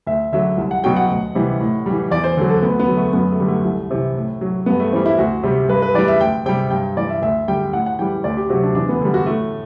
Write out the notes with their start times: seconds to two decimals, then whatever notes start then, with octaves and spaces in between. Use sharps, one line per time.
0.07 D2 E5
0.32 D3 F#3 E5
0.58 C2
0.71 F#5
0.84 B2 F#3 G5
0.96 F#5
1.09 D2
1.35 C3 E3 G3
1.60 A2
1.86 E3 G3
2.11 E2 D5
2.24 C5
2.37 D3 F#3
2.50 A4
2.62 D2 B3
2.80 B3
2.88 D3 F#3
2.97 A3
3.13 F#2 B3
3.31 A3
3.40 D3 G3
3.48 A3
3.65 C2
3.91 C3 E3
4.16 A2
4.41 F#3
4.66 G2 B3
4.80 A3
4.92 E3 G3 C4
5.06 E4
5.18 D2 F#4
5.43 C3 G3
5.69 G2 B4
5.82 B4
5.94 E3 G3 D5
6.08 E5
6.20 D2 G5
6.46 C3 G3 G5
6.71 G2 G5
6.97 E3 G3 D5
7.09 E5
7.22 D2 E5
7.48 D3 G3 G5
7.73 A2 F#5
7.86 F#5
7.99 E3 G3 G5
8.24 D2 D5
8.37 G4
8.49 C3 F#3 F#4
8.63 D4
8.75 E2 D4
8.89 B3
9.01 D3 G3
9.14 F#4
9.26 A2 A3